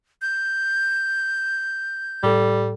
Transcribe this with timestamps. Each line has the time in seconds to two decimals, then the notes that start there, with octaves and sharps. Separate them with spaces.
0.22 G6
2.23 A2 G3 A4